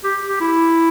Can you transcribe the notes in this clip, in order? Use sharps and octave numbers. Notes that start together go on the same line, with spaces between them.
G4
G4
E4